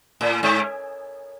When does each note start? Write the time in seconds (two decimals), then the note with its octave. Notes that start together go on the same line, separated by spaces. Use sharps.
0.21 A2
0.43 G#2